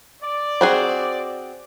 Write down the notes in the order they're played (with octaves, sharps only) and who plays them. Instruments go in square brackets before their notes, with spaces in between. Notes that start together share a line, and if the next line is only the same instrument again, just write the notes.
[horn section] D5
[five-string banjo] C4 F#4 G#4